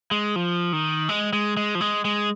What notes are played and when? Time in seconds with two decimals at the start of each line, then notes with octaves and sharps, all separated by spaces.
0.11 G#3
0.36 F3
0.73 D#3
1.09 G#3
1.33 G#3
1.57 G#3
1.75 F3
1.81 G#3
2.05 G#3